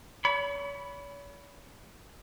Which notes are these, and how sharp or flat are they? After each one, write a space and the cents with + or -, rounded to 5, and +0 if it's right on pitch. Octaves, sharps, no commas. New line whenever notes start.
C#5 +40 B5 +0